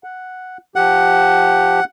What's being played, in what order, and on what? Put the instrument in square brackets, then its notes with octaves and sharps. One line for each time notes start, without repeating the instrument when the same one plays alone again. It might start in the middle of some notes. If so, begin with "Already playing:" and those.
[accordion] F#5
[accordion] F3 G4 [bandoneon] F#5